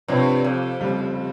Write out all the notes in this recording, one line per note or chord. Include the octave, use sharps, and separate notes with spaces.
G2 C3 F3 C4 G4 C#5
F2
F1 D#2 C#3 G3 C4